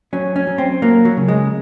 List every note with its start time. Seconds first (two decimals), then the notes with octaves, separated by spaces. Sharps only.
0.13 F#3 C#4
0.36 C#4
0.47 F#3
0.58 C4
0.82 F#3 A#3
1.05 F#3
1.17 C#3
1.28 G#3